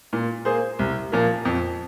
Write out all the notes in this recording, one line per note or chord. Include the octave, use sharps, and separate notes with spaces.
A#2
A#3 G#4 C5
C2
A#2 F3 A#3
F2